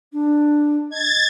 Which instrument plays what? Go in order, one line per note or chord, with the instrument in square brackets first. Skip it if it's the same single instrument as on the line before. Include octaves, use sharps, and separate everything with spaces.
[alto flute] D4
[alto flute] D#5 [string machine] G#6 A6